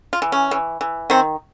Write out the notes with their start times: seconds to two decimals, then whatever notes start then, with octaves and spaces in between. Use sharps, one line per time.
0.13 F4
0.22 E3
0.32 C#4
0.51 E3
0.81 E3
1.10 D#3 C4